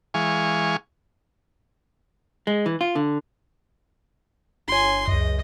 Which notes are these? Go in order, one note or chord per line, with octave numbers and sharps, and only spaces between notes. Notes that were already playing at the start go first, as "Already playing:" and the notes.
E3 G#3 F5 G#5 C#6
G#3
E3
F4
D3
G1 C#5 G#5 C6
C#2 F#2 D#5